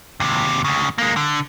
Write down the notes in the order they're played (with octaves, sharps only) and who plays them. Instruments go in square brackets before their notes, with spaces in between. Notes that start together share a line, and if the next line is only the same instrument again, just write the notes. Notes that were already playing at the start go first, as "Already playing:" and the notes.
[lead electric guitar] D#2 C3
D2 C#3
G#3 A#3
D3